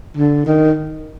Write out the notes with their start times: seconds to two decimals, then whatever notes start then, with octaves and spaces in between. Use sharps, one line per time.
0.17 D3
0.46 D#3